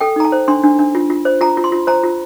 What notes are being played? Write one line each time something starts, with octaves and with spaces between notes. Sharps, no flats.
A4 G5
D#4 A#5
A5
C5
D4 C6
D4
D4
F4
F4
C5
F4 A#5
F4
C6
F4
C5 A#5
F4